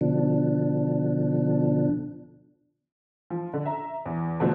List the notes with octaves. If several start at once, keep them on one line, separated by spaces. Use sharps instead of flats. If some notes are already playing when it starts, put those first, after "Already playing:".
B2 D3 F3 D4
F3
D3
E5 A#5
E2
B2 D3 F3 F#3 A3 C4